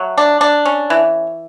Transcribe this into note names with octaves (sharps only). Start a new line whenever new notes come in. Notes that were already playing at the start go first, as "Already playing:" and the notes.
Already playing: F#3 A3
D4
D4
C#4
E3